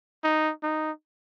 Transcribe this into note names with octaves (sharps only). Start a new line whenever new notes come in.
D#4
D#4